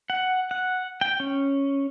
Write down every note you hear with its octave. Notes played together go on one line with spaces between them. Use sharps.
F#5
F#5
G5
C#4